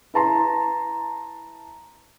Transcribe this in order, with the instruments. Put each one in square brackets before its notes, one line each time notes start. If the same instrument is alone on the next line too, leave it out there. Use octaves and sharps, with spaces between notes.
[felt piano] E4 B4 A5 A#5 C6